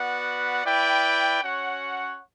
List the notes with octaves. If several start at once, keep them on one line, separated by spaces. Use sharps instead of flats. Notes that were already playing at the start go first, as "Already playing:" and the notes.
Already playing: B3 F#4 B4 D5 F#5
E4 B4 D5 G5
C#4 F#4 C#5 F#5